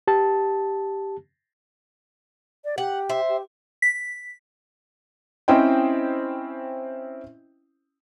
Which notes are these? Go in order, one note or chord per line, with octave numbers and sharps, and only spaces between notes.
G4 A5
D5
G4 F#5
C5 E5
G4
B6
C4 C#4 E4 C5 D#5 G5